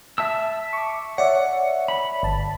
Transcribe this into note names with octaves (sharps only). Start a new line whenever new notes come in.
E5 A5 E6
C#6 D6
C#5 D5 E5 F#5
B5
G1 A5